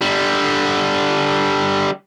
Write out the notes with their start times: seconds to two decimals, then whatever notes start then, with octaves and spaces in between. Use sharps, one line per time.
0.01 D3 G3